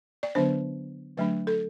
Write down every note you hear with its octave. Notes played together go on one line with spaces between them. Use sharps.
D5
D3 F#3 B3 D4 C5
D3 F#3 A3 D4 B4
A4